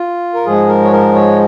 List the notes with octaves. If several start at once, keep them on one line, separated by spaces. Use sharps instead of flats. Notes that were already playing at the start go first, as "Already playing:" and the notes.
Already playing: F4
A#4
G#2 F3 G#3 G#4
A#4
C#5
A#4
C#5